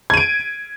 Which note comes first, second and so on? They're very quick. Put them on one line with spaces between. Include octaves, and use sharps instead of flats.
G#6 D#7 D7